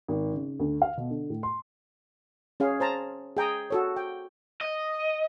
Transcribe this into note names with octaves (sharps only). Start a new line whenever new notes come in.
G#1
C#3
D2
F5
B2
D3
A2
C6
C#4 G#4 F5
C5 A5 A#5
G#4 G5 A#5 D#6
F#4 A4 C#5
G5
D#5